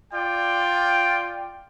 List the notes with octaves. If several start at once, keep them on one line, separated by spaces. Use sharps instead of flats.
F4 D5 G5